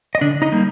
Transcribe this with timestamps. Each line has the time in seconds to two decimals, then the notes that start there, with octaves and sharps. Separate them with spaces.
0.15 D#5
0.21 D3 D4 D5
0.42 D#4 D#5
0.52 G3 A#3